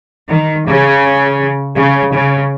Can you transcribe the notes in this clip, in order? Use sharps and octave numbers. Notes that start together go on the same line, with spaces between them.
D#3
C#3
C#3
C#3